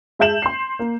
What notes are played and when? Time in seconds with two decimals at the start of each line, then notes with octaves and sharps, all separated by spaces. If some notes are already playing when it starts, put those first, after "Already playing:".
0.19 G#3 E5 A5 G6 E7 F#7
0.42 C6 C7
0.79 A#3